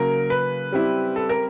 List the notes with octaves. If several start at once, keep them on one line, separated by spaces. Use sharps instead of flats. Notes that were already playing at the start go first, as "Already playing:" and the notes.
Already playing: C#3 F#3 A#3 A#4
B4
G3 C4 E4 G4
A4
A#4